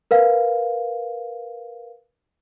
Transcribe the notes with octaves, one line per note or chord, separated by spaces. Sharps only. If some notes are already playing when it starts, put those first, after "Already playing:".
A#4 B4 F5